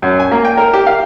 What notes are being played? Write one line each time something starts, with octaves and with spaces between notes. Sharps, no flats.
F#2
G#5
A#3
G5
A#4
G4
F5